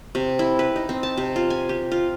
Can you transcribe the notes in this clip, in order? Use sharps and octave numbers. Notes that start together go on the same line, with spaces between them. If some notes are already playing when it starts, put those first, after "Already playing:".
C3
E4
B4
D#4
C4
A5
C3
F4
G#5
G4
F4